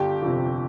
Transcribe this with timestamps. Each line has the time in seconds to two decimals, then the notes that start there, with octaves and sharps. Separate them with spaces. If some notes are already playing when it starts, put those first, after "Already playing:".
Already playing: G1 G4
0.22 F2 C3